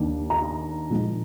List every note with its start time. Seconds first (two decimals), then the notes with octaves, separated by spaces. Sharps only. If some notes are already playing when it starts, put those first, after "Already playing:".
Already playing: D#2 D#3 A#3 D4
0.30 A#5
0.90 A#2 F3 G#3 D#4